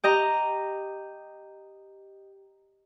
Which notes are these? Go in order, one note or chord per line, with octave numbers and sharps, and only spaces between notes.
G4 D#5 A#5